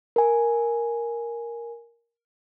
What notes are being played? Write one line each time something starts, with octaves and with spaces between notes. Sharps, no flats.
A#4 G#5